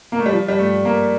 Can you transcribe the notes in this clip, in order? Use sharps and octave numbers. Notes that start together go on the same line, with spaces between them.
A#3
A3
G3
F3
G3
A3
A#3